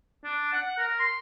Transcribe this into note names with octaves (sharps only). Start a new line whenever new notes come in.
D4
F#5
A#4
C6